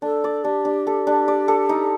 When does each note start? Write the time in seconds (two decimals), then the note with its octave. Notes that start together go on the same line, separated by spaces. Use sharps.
0.02 D4 A4
0.24 D5
0.44 D4 G4
0.65 D4
0.87 A4
1.07 D4
1.28 D5
1.48 A4
1.69 D#4